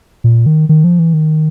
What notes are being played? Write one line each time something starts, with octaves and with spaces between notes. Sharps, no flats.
A#2
D#3
D#3
F3
E3
D#3